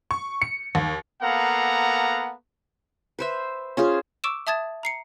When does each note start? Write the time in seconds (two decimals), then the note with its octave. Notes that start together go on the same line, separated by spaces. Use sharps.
0.11 C#6
0.42 C#7
0.75 D#2
1.21 A#3 B3 A4 F5 F#5 A#5
3.19 B4 C5 E5
3.77 C#4 F4 G#4 C5
4.24 C#6 D6 E6 D7 E7
4.47 E5 A5 D#6 G#6 A6 E7
4.83 A#5 C7 C#7